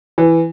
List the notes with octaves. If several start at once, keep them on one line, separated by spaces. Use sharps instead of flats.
E3